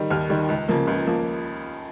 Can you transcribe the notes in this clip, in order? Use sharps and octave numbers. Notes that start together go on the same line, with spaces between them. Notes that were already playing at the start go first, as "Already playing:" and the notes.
Already playing: D#3 G3
D#2 F6
D#3 G3
C#2
C#3 F3 A#3
C#2
F3 A#3